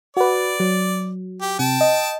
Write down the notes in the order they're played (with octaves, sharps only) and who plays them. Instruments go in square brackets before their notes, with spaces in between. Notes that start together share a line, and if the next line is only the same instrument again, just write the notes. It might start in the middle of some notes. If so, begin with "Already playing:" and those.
[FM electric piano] F#4 B4 [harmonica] D5
[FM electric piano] F#3
[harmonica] G4
[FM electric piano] C3 [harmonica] G5 A5
[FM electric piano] D#5